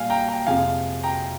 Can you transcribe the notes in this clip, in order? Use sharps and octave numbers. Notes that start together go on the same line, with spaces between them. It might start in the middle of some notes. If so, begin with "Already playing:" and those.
Already playing: A#2 G3 F5 G#5
G5 A#5
G5 A#5
F2 C3 F3 G#3 F5 G#5
G5 A#5